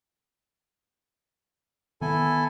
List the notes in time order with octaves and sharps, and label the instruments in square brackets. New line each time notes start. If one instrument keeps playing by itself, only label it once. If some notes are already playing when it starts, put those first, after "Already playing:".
[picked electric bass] D#3 B3 [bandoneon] E4 A4 G#5